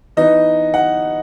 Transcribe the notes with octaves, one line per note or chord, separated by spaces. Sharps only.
E3 B3 D#4 D#5
F#5